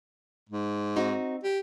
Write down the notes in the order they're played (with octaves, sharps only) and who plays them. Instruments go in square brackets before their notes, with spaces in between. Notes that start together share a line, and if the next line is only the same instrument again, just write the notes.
[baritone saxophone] G#2
[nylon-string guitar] C4 D#4 F#4
[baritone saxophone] G4